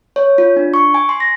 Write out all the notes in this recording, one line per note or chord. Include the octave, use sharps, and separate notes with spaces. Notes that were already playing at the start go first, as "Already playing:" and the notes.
C#5
F4
D4
C#6
G#5
C6
A#6